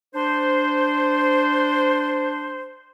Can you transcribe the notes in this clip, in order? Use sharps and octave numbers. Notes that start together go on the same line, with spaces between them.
D4 C5